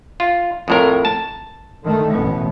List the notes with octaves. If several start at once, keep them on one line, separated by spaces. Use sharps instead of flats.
F4
F2 A2 A#4
A5
D3 D#3 A3
A1 B2 B3